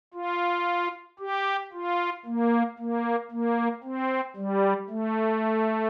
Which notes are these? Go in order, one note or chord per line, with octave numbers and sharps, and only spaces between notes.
F4
G4
F4
A#3
A#3
A#3
C4
G3
A3